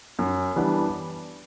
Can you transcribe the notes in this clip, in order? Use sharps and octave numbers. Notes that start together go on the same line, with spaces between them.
F#2
E3 G3 B3 D4